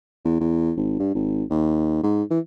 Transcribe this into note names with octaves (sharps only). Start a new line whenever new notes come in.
E2
E2
G#1
G2
G#1
D#2
G#2
E3